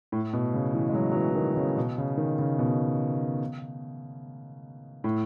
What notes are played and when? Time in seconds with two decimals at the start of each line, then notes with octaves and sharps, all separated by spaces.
0.12 A2
0.33 B2
0.54 C#3
0.74 E3
0.89 G#3
0.94 F#3
1.12 F#3
1.16 E3
1.30 E3
1.35 D#3
1.52 D#3
1.57 C#3
1.77 B2
1.98 C#3
2.17 D#3
2.38 C#3
2.59 B2
5.04 A2